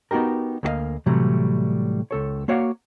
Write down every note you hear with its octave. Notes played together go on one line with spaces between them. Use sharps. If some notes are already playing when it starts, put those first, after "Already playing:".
B3 D#4 F#4 G4 A#4
D2 A#3 F#4 D#5 F5
A2 C3 E3 F#3 G3
C#2 A4 C#5
A#3 F#4 C#5 D5 F5 F#5